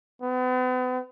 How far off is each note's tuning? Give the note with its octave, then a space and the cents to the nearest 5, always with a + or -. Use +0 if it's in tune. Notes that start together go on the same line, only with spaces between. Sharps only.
B3 +40